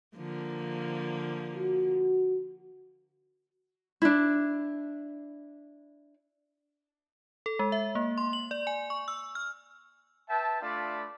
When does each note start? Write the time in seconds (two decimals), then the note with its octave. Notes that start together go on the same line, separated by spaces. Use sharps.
0.16 D3 F3 A#3
1.55 F#4
4.02 D4 E4
7.46 A4
7.59 G#3
7.72 E5
7.95 A#3
8.18 C6
8.33 F#7
8.51 D5
8.67 G#5
8.90 C#6
9.08 E6
9.35 F6
10.29 B4 E5 G5 A5
10.61 A3 D4 F4 D5 A5 B5